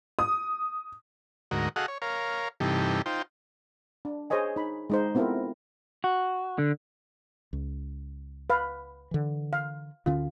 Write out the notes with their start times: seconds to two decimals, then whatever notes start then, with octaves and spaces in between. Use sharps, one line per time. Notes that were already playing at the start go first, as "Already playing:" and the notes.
0.19 D#6
1.51 D2 G#2 F#4 A#4 D#5
1.76 F#4 G#4 A4 D#5 F5 F#5
1.88 C#5
2.02 A#4 C#5 F5
2.60 G2 C3 E3 D#4 G4 A4
3.06 D#4 F4 C5 G5
4.05 D4
4.30 G#4 C5 C#5 D#5 G#5
4.56 D#4 B5
4.90 G#3 D#4 C5
5.15 B3 C4 E4 F4 A4 A#4
6.04 F#4
6.58 D3
7.53 C#2
8.50 B4 F5
9.11 D3 E3
9.53 F5
10.06 D2 D3 C#4 F4